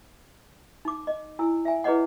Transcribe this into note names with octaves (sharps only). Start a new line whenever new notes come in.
D#4 D6
D#5
E4 G#5 E6
E5 G#5
E4 G#4 B4 C#5 D#5 F#5